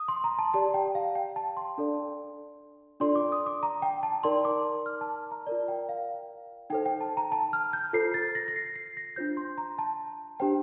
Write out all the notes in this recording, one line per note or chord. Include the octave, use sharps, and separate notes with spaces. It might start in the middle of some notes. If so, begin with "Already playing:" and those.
Already playing: D#6
C6
A#5
A5
G4 D5 A5
G5
F5
G5
A5
C6
D4 A4 D5
D4 F4 A4 D5 C6
D6
D#6
D6
A#5
G5
A5
D#4 A#4 D5 C6
D6
F6
A5
A#5
F4 A#4 D5
G5
F5
D#4 A4 C5 G5
G5
A5
A#5
A5
F6
G6
F4 A4 C5 C7
A6
A#6
A#6
C7
C7
A#6
D4 F4 C5 G6
C6
A#5
A5
D4 G4 C5 G5